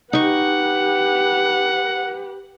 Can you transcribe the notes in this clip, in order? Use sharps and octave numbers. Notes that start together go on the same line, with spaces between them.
D#4 G4 B4 F#5 C#6